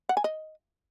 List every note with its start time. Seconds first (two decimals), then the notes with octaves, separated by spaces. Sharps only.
0.09 F#5
0.17 G#5
0.24 D#5